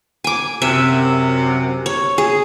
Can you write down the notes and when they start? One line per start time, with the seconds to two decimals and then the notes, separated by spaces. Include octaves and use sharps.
0.24 G#5 D6
0.62 F#2 C3 E5
1.86 C#5
2.18 G#4